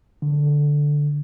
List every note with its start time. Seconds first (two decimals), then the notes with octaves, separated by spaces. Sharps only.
0.22 D3